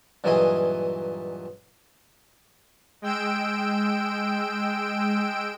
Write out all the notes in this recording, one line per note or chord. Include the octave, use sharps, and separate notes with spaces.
G2 A#2 E3 F#3 G#4 D#5
G#3 G5 E6 D7